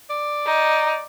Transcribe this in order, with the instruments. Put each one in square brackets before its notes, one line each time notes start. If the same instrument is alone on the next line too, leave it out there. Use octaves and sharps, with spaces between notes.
[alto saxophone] D5
[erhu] D#4